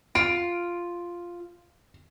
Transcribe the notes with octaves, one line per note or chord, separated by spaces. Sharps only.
F4 D7